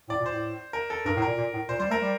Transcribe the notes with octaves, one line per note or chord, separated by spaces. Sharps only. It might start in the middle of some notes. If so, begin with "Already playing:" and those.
A2 D5
A#2
C5
A2
A#4
A4
G2 A#4
A2
A#2 A#4
A#2
A2
A#2 C5
G3 C5
A3 A#4
G3